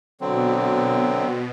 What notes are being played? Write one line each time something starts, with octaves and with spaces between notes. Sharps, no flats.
B2 D3 F#3 C4